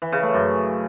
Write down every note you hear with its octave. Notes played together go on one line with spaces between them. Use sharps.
E3
C#3
A3
F#2